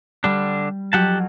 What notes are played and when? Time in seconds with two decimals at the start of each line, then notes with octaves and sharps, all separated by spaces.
0.24 D3 G3 D4
0.93 F2 F#3 G4 F#5 A5